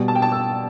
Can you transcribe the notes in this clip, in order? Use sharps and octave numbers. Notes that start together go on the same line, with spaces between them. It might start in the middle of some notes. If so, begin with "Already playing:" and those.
Already playing: B2 G3
A5
G5
A5
E6